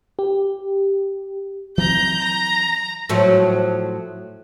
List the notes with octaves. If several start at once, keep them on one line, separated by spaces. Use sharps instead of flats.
G4
E3 F#3 C4 A#5 G6
A#5
A2 F3 F#3